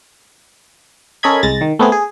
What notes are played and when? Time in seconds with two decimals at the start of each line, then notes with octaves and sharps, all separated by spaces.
1.23 C#4 A4 A#4 D#5 B5 G#6
1.43 C2 G#3 A6 A#6
1.61 D#3
1.79 A3 B3 C4 G#4
1.92 G#4